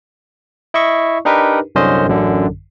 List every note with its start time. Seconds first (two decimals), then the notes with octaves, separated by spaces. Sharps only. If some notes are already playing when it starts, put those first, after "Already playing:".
0.74 E4 D#5 E5 C#6
1.25 D4 D#4 G4 A#4 B4
1.75 C2 F#2 D3 C#4 C5 D#5
2.06 A1 F#2 D3